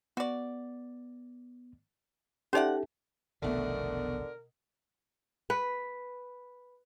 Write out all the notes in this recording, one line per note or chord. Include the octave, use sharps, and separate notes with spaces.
B3 F#4 D5
C#4 D#4 G4 A4 C5 D5 E5 F#5
F1 B1 B2 D3 D#3 A3 A#4
B4